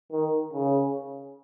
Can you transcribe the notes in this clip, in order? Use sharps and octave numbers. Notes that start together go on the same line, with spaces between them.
D#3
C#3